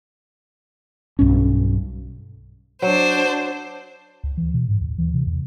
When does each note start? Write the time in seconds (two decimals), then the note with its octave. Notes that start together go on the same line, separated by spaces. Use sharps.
1.19 B1 G2 C#4
2.82 F#3 D4 C5
4.24 D2
4.37 E3
4.54 B2
4.69 G#2
4.81 D#2
4.98 E3
5.14 C3
5.27 E2